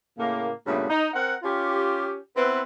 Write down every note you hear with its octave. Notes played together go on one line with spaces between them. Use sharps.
A2 C#3 A#3
G2 A#2 C#3 A3 B3
D#4
C4 A#4 F#5
C#4 F4 G4
B3 C4 E4 B4